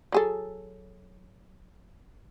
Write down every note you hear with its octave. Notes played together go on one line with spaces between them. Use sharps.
F#3 G#4 A4